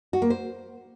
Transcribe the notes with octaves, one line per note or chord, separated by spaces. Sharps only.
F#4
A#3
C5